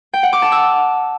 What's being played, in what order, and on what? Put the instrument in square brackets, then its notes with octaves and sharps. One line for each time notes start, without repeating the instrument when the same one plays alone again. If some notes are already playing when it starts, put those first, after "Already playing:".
[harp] G5
F#5
D6
A5
E6